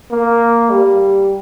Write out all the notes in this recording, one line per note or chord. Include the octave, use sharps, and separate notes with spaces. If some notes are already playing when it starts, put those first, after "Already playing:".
A#3
G3